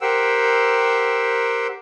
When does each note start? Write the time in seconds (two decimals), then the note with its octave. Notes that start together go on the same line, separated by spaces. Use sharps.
0.01 G4 A#4 C5 F#5 G5 E6